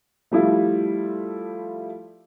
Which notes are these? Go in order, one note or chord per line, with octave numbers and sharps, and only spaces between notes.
F3 G3 A3 E4 F4